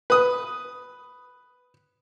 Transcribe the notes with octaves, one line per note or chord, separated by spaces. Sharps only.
B4 D#6